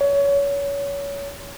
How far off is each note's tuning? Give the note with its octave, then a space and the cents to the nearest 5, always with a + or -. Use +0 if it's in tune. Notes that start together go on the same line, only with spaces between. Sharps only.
C#5 +25